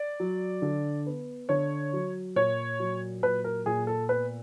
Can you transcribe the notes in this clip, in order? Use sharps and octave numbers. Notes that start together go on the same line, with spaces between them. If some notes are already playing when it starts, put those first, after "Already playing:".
Already playing: D5
F#3
D3
B3
D3 C#5
F#3
A#2 C#5
F#3
A#2 B4
A#4
A#2 G#4
A4
B3 B4